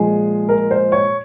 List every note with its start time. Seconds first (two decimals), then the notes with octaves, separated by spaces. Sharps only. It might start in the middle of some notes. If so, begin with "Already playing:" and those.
Already playing: A#2 F3 G#3 G#4
0.49 A#4
0.71 C5
0.92 C#5